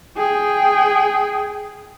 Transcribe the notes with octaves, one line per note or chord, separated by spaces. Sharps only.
G#4 G5